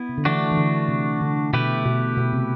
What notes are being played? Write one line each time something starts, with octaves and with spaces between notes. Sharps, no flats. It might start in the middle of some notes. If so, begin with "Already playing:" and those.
Already playing: B3 E4
C3
D3
E3 A3 D4 F#4
E3
D3
C3
D3
B2 A3 E4 G4 B4
B2
B2
C3